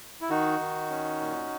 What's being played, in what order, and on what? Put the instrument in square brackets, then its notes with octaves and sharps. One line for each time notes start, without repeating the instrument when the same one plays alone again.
[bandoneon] E4
D#3 D#4 F#4
D#3
C#4
A#2